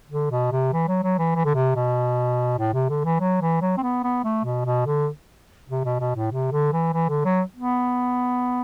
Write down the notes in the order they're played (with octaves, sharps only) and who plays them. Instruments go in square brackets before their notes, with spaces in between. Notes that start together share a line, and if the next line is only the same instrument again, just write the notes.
[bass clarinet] D3
B2
C3
E3
F#3
F#3
E3
E3
D3
C3
B2
A2
C3
D3
E3
F#3
E3
F#3
C4
B3
B3
A3
B2
B2
D3
C3
B2
B2
A2
C3
D3
E3
E3
D3
F#3
B3